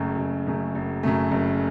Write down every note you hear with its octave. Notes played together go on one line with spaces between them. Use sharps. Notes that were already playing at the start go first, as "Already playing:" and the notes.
Already playing: F#1 F#2 C#3 A3
F#1
F#2 C#3 A3
F#1
F#2 C#3 A3
F#1